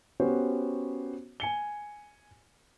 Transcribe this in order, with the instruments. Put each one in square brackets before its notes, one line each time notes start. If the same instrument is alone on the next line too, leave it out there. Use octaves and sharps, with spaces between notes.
[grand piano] B3 C#4 F#4 G4 C5 C#5
G#5 C#7 G7